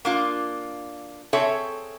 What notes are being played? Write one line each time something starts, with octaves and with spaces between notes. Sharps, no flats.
A#3 D4 F4
C4 G#4 A4 C#5 E5